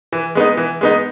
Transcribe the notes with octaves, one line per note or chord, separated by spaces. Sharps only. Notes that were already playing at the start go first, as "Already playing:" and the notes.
E3
G#3 B3 D#4
E3
G#3 B3 D#4